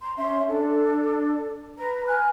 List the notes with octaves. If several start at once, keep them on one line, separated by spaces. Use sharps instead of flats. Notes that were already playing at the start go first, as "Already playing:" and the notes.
A#5 C6
C#4 E5 C6
D4 A4
B4 A#5
G#5 F6 F#6